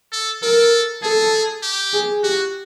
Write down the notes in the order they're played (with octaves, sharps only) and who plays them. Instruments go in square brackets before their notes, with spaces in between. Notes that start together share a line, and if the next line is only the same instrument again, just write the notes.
[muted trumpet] A4
[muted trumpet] A4 [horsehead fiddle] A#4
[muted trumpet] G#4 [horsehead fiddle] A4
[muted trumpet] G4
[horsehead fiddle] G#4
[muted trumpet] F#4 [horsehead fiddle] G4